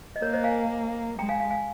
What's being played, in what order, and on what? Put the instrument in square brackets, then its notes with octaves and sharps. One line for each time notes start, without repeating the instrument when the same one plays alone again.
[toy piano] D#5
[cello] A#3 [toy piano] A#4 C#5
[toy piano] C5 D#5
F5 G#5
[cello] G#3 [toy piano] G5 A#5
[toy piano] F5 G#5
F5 G#5
F5 G#5